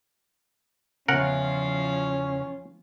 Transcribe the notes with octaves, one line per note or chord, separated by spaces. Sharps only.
E2 C#3 F3 C#4 F4 A#4 F#5